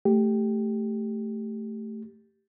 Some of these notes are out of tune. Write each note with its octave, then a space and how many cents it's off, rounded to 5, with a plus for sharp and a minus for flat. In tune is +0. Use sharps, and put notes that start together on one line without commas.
A3 +0 G4 +0